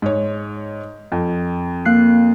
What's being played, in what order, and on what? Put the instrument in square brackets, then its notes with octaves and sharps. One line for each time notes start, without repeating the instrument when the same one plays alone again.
[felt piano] G#2 C#5
F2
[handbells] A#3 F#6 C7